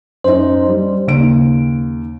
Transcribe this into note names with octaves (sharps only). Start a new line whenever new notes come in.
F#2 D#4 C5
G3
D#2 C#3 D7